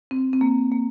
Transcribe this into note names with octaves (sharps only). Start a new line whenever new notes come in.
C4
C4
A#3
A#3